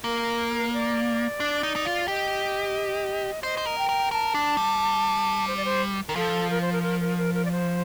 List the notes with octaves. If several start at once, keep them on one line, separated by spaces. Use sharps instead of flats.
A#3 A#4
D5
D4
D#4
D#4
F4
G4 D#5
C5 D#5
C5
A#4
G5
A#4
A#4 A5
D4
G3
C5
D5
C5
D#3 A#4
F3 A4
A#4
C5
A#4
A#4
A#4
A#4
A#4
D5
C5